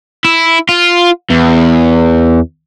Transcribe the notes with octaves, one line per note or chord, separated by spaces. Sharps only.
E4
F4
E2